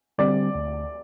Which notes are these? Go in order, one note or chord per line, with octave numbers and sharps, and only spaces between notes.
D3 G3 C4 D5
D2